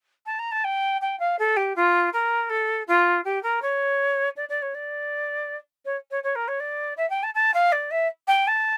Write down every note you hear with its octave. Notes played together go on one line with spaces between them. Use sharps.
A5
A#5
A5
G5
G5
F5
A4
G4
F4
A#4
A4
F4
G4
A#4
C#5
D5
D5
C#5
D5
C#5
C#5
C#5
A#4
C#5
D5
E5
G5
A5
A5
F5
D5
E5
G5
A5